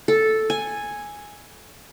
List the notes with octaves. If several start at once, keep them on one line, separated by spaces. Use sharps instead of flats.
A4
G#5